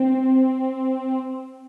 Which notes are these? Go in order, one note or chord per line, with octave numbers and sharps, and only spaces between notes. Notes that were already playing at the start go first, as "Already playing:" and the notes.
Already playing: C4